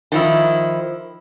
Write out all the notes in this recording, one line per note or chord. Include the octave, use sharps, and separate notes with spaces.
D#3 F3 E4